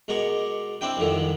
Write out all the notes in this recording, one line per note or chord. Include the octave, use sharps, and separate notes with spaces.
B2 G#3 A#4 C#5 D5
C4 D4 E4 G5
C2 F2 D3 D#3 F3